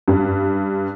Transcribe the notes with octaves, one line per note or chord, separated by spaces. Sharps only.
G2